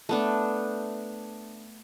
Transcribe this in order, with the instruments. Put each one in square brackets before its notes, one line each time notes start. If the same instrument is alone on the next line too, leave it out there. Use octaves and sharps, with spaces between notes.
[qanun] A3 B3 D4